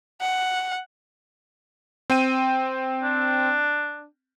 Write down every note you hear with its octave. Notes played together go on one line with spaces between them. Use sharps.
F#5
C4 G5 D#7
D4